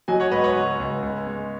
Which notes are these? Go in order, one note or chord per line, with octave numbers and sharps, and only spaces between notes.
F#3 D#5 G#5
C#5 F#5
G#2 B4 D#5
C#5 F#5
C#2
C#2
C#2
G#3